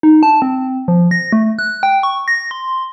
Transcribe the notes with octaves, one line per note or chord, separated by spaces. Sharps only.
D#4
A5
C4
F3
A#6
A3
F#6
G5
C#6
A#6
C6